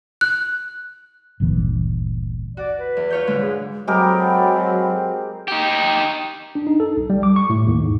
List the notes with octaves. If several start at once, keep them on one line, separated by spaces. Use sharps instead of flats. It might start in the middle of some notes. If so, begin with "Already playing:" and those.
F#6
G1 D2 A#2 E3
F#4 D5
B4
E2
F4 C#5 G6
G#2 D3 G#3
G#4
F#3 G#3 C4 G4 A4 A#4 F#5 B5
D#4 G4
D4
D#4
A4
B1
G3
D6
C#6
A2
D#2
G#2